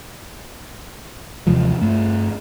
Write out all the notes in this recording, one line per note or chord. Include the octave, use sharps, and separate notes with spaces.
D#2 C3 E3 F3
G2 A3